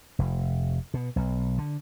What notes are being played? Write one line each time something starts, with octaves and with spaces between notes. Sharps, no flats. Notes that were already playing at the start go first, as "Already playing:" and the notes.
F1
B2
B1
D3